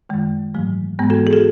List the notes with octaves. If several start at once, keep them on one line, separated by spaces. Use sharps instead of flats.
F#2 D#3 G#3
G#2 E3 F#3 A3
G#2 E3 G#3 B3
F#4 A4
G#4
F#4 A4